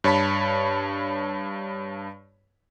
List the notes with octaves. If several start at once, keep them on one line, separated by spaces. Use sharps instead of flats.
G2 C#5 A5 B5 B6